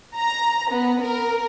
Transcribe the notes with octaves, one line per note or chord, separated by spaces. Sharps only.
A#5
B3
A#4